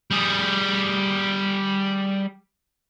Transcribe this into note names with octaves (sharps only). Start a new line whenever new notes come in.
G3 G#4